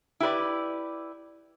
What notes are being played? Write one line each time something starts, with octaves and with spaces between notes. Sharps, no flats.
E4 G4 B4 D5